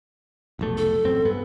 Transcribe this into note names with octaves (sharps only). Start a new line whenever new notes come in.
F1 B1 A3
A4
A1 F#2 C4
G2 B3